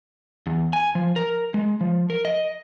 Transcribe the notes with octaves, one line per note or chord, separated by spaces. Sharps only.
E2
G#5
F3
A#4
G#3
F3
A#4
D#5